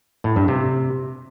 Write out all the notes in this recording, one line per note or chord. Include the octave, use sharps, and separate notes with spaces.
A2
G2
C3